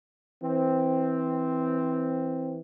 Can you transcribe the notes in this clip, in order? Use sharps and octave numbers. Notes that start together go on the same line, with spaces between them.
E3 C4